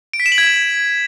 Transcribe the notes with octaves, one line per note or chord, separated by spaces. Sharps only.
D7
B6
E7
F#7
G#6